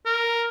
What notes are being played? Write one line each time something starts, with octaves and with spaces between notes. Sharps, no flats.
A#4